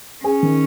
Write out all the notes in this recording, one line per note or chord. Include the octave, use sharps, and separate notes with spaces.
C#4 G#4
D#3